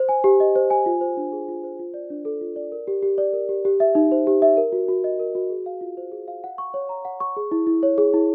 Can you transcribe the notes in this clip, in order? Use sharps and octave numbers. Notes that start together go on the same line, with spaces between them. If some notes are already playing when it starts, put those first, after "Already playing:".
Already playing: C5
G#5
G4
D#5
C5
G#5
F4
C5
D4
G#4
F4
C5
F4
D5
D4
A4
F4
D5
A#4
G4
G4
D5
A#4
G4
G4
E5
D#4
C5
G4
E5
A#4
F#4
F#4
D#5
A#4
F#4
G#4
F5
F4
C5
G#4
F5
F#5
C#6
C#5
A#5
F#5
C#6
G#4
E4
E4
C#5
G#4
E4